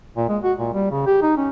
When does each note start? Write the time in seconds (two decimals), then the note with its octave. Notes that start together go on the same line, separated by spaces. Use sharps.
0.17 A#2
0.29 G#3
0.43 F#4
0.59 A#2
0.73 G3
0.91 C#3
1.06 G4
1.22 D#4
1.37 C#4